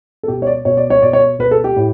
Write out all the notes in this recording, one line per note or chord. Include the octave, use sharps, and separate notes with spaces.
A4
B2 G4
C#5
D5
B2 C#5
D5
C#5
B2 D5
C#5
B2 B4
A4
G4
A2